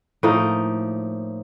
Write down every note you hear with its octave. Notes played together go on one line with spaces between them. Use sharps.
A2 F3 A#3 D#4